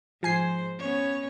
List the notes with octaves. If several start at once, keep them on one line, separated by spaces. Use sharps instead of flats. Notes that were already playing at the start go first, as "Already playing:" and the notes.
G#2 F3 C5 G#5 C7
B3 C#4 C#5